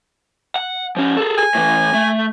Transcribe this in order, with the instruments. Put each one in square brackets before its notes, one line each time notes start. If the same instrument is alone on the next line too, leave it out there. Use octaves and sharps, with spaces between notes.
[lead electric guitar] F#5
F3 C#4
G#4 A4
[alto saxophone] G#5
[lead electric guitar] A2 E3
A3